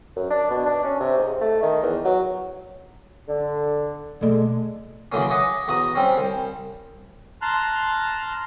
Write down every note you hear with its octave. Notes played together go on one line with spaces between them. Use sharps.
F#2
D4
B2
D4
C#4
C3
G#2
A3
D#3
E2
F#3
D3
B2 D3 G#3 A3
C#3 E3 F#3 G#3 A#3 C#4
C#5 D#5 F#5 B5 D6
E2 F#4 A#5 D#6
G3 C4 C#4
C2
A5 A#5 C6 F6 F#6